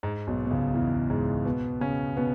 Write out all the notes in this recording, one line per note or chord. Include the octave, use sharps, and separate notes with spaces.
G#2
B1 B2
B2
C#2 C#3
E2 E3
G#2 G#3
B2 B3
C#3 C#4
B2 B3